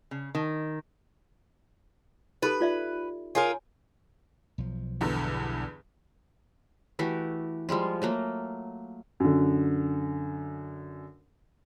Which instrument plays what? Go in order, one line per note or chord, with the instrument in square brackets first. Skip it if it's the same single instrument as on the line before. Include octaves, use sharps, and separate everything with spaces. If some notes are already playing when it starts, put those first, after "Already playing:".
[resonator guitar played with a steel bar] C#3
D#3
[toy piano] D#4 G4 A4 [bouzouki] B4
[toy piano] F4 D5 E5
[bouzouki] F4 G#4 A#4 [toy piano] C#5 G#5
[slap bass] B1 F3
[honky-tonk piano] E2 G2 D3
[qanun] E3 A3 F#4 G4
F3 G3 G#3 F4
F#3 A3 A#3
[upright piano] F#2 D3